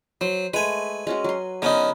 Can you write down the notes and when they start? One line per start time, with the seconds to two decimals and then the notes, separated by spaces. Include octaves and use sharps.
0.21 F#3 C5
0.54 G#3 A3 B4 G#5
1.07 G#3 C#4 F#4
1.24 F#3 C6
1.62 D3 B3 C#4 D#4 A#4